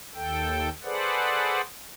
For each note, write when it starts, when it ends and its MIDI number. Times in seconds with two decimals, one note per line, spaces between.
0.15 0.69 39
0.15 0.69 69
0.15 0.69 79
0.84 1.61 68
0.84 1.61 69
0.84 1.61 71
0.84 1.61 72
0.84 1.61 74
0.84 1.61 78